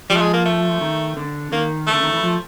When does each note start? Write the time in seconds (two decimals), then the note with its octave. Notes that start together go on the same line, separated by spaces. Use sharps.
0.10 F3 G3
0.17 A3
0.21 G#3
0.33 A#3
0.45 A3
0.81 D#3
1.17 D3
1.52 D#3 A#3
1.87 A3
1.93 D3
2.03 D#3
2.13 E3
2.23 F3